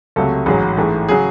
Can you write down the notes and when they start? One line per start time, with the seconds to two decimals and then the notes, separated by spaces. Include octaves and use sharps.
0.16 C#2 C3 F#3 A3 A4
0.46 A1 G#2 F#3 G#4
0.77 A1 G#2 E3 A3
1.09 C#3 F#3 G#4